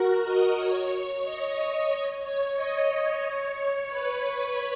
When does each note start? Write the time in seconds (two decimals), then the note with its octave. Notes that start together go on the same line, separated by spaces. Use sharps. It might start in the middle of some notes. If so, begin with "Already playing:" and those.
Already playing: F#4 A#4
0.25 D#5
0.57 C#5
1.24 D#5
1.90 C#5
2.22 C#5
2.56 D#5
3.22 C#5
3.88 B4
4.21 C#5